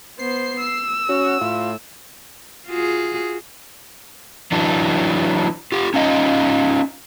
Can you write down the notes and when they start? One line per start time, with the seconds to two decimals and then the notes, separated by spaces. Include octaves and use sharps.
0.19 B3 C5 C7
0.60 E6
1.09 C#4 F#4
1.41 A2 F4
2.67 F4 F#4 G#4
4.52 E3 F#3 D4
5.72 F4 G4
5.94 C#4 D#4 F4 D#5